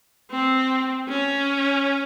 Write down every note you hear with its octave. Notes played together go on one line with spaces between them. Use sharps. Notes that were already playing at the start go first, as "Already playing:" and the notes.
C4
C#4